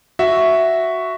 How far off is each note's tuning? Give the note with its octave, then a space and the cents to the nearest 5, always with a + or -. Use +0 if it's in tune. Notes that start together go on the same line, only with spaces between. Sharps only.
F#4 +0 E5 +0